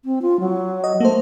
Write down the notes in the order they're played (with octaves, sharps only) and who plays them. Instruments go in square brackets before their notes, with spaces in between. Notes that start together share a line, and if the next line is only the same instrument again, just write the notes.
[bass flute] C4
F4
F#3
[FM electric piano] D#5
[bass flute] A3 [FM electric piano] A#3 C5